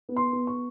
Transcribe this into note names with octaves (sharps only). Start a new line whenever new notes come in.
B3
C6
B3
C#6